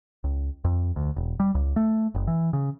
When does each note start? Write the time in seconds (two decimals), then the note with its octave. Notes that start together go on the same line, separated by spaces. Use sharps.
0.24 C#2
0.65 F2
0.96 D2
1.16 E1
1.40 G3
1.55 C#2
1.76 A3
2.15 F#1
2.27 E3
2.53 C#3